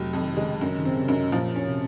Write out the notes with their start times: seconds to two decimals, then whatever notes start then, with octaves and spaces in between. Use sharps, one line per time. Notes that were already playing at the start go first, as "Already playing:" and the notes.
Already playing: F1 F#3
0.13 F2 D#3
0.33 D#3
0.37 C#3 G#3
0.61 F#2 C3
0.79 D#3
0.85 C#3 C4
0.96 C3
1.08 F#2
1.32 A#2 F3
1.56 C#4
1.68 C3